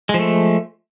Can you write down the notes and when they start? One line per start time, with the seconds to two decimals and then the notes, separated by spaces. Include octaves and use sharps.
0.09 G#3
0.14 F3
0.19 A3